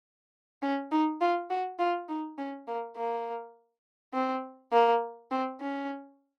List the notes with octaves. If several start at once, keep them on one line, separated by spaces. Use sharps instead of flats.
C#4
D#4
F4
F#4
F4
D#4
C#4
A#3
A#3
C4
A#3
C4
C#4